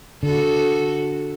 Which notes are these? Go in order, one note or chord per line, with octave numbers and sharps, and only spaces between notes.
D3 F#4 A4